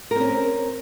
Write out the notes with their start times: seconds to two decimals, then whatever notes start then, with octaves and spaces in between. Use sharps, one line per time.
0.11 A#4
0.16 C4
0.20 C#4